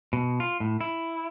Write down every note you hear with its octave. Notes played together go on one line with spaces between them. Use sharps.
B2
F4
A2
E4